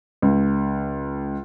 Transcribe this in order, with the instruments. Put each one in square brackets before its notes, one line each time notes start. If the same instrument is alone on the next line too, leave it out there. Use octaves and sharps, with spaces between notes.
[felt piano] C#2